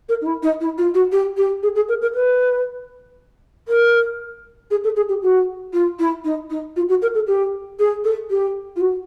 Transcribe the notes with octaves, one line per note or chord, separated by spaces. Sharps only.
A#4
D#4
E4
D#4
E4
F4
F#4
G4
G4
G#4
G#4
A#4
A#4
B4
A#4
G#4
A4
G#4
G4
F#4
F4
E4
D#4
D#4
F4
F#4
A#4
A4
G4
G#4
A4
G4
F4
F#4